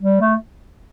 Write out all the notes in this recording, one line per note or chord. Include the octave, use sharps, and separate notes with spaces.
G3
A3